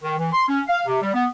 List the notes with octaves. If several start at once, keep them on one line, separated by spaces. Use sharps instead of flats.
D#3
E3
C6
C#4
F5
C3
G3
B3